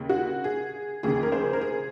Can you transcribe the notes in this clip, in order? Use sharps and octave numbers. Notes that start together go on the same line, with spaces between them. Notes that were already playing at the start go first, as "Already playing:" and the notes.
Already playing: D#2 C#3
F#4
G#4
F1 D#2 C#3 G#4
A#4
G#4 C5
A#4
G#4